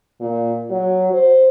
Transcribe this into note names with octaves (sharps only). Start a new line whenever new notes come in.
A#2
F#3
C5